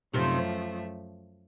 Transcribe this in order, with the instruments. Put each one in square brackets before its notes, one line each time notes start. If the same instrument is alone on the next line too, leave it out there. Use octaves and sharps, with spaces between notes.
[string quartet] F#2 F3 A3 [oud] C3 D#3